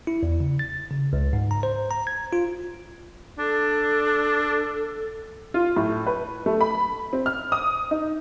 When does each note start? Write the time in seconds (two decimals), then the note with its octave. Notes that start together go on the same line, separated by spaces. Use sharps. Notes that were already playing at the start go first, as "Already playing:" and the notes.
0.07 E4
0.23 E2
0.40 C#3
0.59 A6
0.91 C#3
1.13 C#2
1.33 G#2
1.51 A#5
1.63 C5
1.91 A#5
2.07 G#6
2.33 F4
3.39 D4 A4
5.54 F4
5.76 A2
6.07 B4
6.46 A3
6.61 B5
7.13 C4
7.26 F6
7.52 D#6
7.91 D#4